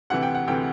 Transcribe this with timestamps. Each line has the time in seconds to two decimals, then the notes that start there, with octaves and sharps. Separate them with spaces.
0.10 D2 C3 E3 F#5
0.23 G5
0.35 F#5
0.48 D2 C3 E3 G5